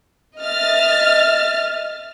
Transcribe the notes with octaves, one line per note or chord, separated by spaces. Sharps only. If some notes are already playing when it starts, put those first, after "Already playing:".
D#5 E5 F6 A6